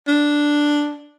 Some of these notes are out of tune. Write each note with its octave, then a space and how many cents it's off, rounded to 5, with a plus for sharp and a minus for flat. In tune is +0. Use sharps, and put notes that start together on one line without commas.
D4 +0